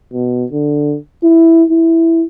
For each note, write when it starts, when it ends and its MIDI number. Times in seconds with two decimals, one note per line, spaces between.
0.13 0.45 47
0.52 0.96 50
1.23 1.64 64
1.70 2.24 64